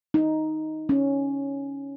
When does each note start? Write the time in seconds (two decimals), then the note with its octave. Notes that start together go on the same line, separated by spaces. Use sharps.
0.14 D#4
0.89 C#4